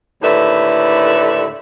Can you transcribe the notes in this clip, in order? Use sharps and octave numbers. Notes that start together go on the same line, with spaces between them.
D#2 A2 D3 B4 E5